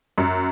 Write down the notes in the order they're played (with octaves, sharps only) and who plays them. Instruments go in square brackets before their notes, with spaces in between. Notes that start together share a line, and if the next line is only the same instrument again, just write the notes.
[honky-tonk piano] F#2